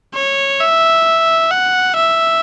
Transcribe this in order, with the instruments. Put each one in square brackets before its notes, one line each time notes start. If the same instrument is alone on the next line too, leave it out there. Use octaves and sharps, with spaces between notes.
[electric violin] C#5
E5
F#5
E5